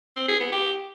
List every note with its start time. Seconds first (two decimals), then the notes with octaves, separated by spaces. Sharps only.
0.16 C4
0.28 G#4
0.40 B3
0.52 G4